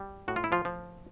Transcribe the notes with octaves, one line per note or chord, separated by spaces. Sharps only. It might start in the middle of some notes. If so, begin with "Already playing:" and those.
Already playing: G3
A2 F#4
F4
E4
F3 F4
F3